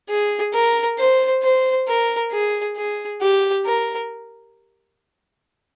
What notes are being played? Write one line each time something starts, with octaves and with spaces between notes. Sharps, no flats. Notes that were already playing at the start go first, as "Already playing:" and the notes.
G#4
A#4
C5
C5
A#4
G#4
G#4
G4
A#4